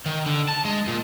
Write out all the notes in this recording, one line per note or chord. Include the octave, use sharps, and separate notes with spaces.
D#3
D3
A5
G#3
A#2